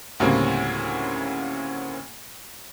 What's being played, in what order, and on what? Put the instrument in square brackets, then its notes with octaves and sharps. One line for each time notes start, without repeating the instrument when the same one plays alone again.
[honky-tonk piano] D2 A2 C#3 G3 A#3 C4